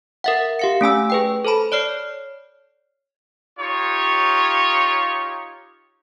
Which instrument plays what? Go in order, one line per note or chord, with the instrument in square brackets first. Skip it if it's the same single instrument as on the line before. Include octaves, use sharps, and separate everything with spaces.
[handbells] A#4 E5 F#5
G4 F5 C#7
A3 C#4 G#5 E6
G#4 B4 G5
A4 C5 A5 B5
C#5 D5 F6 C7
[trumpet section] D#4 F4 G4 C#5